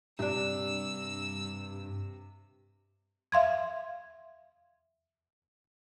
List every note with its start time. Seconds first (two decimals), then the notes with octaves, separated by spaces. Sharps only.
0.19 G2 C3 D4 D#4 E6
3.32 E5 F5 C6 G#6